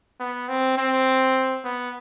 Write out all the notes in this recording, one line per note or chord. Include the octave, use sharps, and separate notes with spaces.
B3
C4
C4
B3